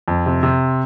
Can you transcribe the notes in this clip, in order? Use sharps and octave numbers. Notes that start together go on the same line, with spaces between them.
F2
C3
C3